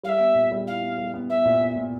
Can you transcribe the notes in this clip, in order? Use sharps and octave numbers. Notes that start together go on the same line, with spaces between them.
G3 E5 F5
B3
A#2
G3
E4 F5
B3
G3
B3
B3 E5
A#2
B3
A#2